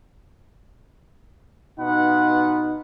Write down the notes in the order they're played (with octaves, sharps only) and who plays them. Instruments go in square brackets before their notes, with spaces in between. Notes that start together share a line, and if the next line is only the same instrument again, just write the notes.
[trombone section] B2 D#4 [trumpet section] F4 B4 F#5